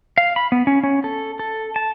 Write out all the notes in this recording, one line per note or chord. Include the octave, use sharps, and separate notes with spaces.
F5
B5
B3
C#4
C#4
A4
A4
A5